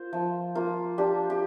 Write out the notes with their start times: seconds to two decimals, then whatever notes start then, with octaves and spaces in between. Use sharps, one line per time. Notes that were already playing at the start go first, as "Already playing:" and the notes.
Already playing: A#3 F4 C5
0.13 F3
0.55 A#3 F4
0.98 D4 G4
1.30 G4